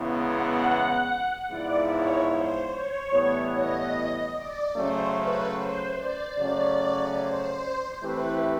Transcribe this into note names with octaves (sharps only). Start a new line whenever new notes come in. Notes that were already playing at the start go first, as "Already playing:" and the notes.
Already playing: E2 C#3 E3 G#3 B3
F#5
G#2 F3 G#3 B3 E4 D5
C#5
C5
C#5
A2 E3 G3 B3
D#5
D5
C#3 F#3 A3 C#4 C5
B4
C5
D5
C#3 F#3 A3 C#4 D5
C5
E3 A3 C4 E4 G4 B4